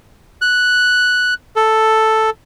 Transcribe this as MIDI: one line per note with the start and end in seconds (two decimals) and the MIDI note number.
0.42 1.34 90
1.56 2.30 69